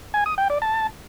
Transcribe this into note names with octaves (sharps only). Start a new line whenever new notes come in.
G#5
D#6
G5
D5
A5